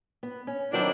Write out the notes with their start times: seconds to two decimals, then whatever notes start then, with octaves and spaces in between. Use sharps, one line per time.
0.23 B3
0.47 C#4
0.73 D#3 F#3 B3 C4 D4 F#4